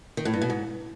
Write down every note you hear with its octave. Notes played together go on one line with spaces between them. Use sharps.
D#3
A2
G2
B2
G#2